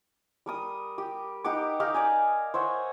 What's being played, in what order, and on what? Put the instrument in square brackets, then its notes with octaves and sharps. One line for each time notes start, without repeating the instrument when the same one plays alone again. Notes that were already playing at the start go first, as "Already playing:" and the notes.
[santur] G3 A#4 D#6
G4
D#4 G4 F#5 D6
D#4 G4 F5 A#5
D5 D#5 G#5
C5 C#5 E5 F#5